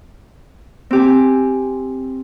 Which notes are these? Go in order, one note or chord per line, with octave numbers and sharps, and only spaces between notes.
C4 G4 G#5